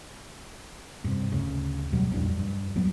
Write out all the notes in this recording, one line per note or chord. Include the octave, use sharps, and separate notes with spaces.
G2 C3
D2 C#3
D2 B2 F#3 G3
A#1 F2 G3 D4
G2
D1 F#3 G3 B3